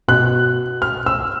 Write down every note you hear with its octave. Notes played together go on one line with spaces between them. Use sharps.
B2 F#6
F6
E6